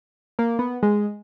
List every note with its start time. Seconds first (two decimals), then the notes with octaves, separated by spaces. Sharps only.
0.39 A#3
0.59 B3
0.83 G#3